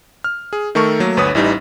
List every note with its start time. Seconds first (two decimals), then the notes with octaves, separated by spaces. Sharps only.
0.24 F6
0.53 G#4
0.75 D#3 A3 A4 A#4 C#6
1.00 F#3 A3 A#3
1.17 G1 D2 B4 C#5 D#6
1.35 A1 E3 G3 D#4